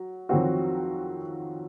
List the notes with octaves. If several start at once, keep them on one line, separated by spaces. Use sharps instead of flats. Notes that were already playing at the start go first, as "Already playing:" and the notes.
Already playing: F#3
F2 D#3 F#3 C4 F#4